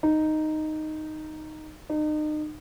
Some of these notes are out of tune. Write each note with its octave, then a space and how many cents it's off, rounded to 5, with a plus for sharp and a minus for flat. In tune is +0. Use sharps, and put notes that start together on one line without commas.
D#4 -5
D#4 -35